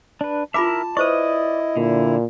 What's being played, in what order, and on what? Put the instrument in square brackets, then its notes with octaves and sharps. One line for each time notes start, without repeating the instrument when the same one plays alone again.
[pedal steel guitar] D4 B4
[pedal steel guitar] E4 A#4 E5 [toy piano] F4 B5 D6 [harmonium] A5
[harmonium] E4 D#5 [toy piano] B4 C5 C#6 [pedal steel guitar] D5 D#6
[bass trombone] A#2 [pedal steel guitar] D3 [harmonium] E4